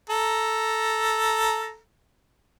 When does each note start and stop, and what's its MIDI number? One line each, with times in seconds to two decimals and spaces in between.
0.10 1.78 69
0.10 1.78 82